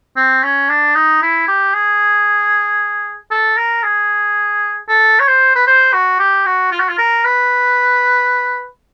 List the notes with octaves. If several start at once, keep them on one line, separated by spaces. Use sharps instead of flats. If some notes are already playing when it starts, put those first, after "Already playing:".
C4
C#4
D4
D#4
E4
G4
G#4
A4
A#4
G#4
A4
C#5
C5
B4
C5
F#4
G4
F#4
F4
F#4
F4
A#4
B4